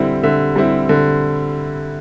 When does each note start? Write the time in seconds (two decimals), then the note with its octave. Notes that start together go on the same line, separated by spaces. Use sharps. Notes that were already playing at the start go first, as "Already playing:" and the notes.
Already playing: D3 G3 C4 E4
0.23 D3 E5
0.56 G3 C4 E4
0.89 D3